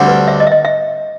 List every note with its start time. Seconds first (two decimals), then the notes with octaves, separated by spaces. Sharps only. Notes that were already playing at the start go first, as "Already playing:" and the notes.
Already playing: D2 D3 G3 C4
0.08 B4
0.28 E5
0.40 D#5
0.47 E5
0.52 D#5
0.65 E5